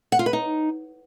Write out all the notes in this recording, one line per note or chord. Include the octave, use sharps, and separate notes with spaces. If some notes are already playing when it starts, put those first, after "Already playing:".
F#5
F4
B4
D#4